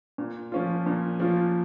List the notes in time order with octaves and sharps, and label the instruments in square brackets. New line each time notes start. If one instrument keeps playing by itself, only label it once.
[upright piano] A#2
F3 C#4 F4
A#2
F3 C#4 F4